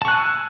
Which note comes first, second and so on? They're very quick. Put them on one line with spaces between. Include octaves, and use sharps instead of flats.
A5 C#6 F#6 G#5 E6